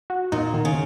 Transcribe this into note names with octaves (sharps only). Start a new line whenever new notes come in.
F#4
A#2 D#4
D#3
C#3